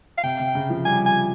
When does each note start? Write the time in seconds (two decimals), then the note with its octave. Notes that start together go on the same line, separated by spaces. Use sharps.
0.18 F5
0.23 C3 G5
0.40 C3
0.55 C#3
0.70 F3
0.85 G3 G#5
1.06 G#5